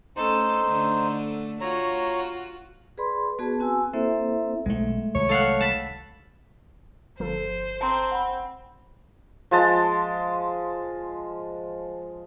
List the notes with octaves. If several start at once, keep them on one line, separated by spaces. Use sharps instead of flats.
A3 C#4 D#4 A4 C5
D3 A3
F4 F#4 C#5 A#5
G#4 B4 D5 B5 C6
B3 F#4 G#4 B4 A5
C4 F#4 G#5 E6
A#3 C4 E4 A4 C5 E5
B1 G#3 A3
C2 D#3 F#3 C#5
A4 F5 F#5
A5 B5
G1 F3 A4 C5
C4 A5 A#5 C6
F#5 B5
F3 G#3 A5